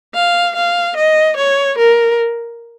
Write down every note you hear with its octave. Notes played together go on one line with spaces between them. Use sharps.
F5
F5
D#5
C#5
A#4